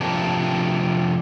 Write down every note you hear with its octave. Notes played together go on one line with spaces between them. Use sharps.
C3 F3 A3 D4 G4 A#4